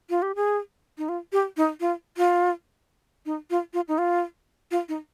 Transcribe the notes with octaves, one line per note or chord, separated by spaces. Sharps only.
F4
G4
G#4
D#4
F4
G4
D#4
F4
F4
D#4
F4
F4
D#4
F4
F4
D#4